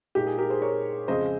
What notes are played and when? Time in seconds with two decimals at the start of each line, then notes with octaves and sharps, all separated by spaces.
0.15 A#2 G#3 D#4 G4
0.27 G#4
0.38 G4 A#4
0.50 G#4 C5
0.62 A#4 C#5
1.08 F2 C#3 G#3 C5 D#5